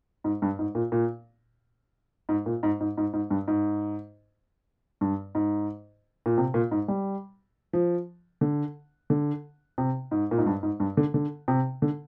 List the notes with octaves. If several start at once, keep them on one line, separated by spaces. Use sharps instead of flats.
G#2
G2
G#2
A#2
A#2
G#2
A#2
G#2
G#2
G#2
G#2
G2
G#2
G2
G#2
A#2
C3
A#2
G#2
G3
F3
D3
D3
C3
G#2
A#2
G#2
G2
G#2
G2
D3
D3
C3
D3